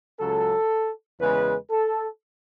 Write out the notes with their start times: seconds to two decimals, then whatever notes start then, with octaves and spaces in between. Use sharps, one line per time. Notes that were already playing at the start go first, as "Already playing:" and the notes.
0.20 C#2 C#3 F#3 A4
1.20 E2 C#3 G#3 B4
1.71 A4